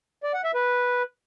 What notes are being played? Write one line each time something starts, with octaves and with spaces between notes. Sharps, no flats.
D5
F#5
E5
B4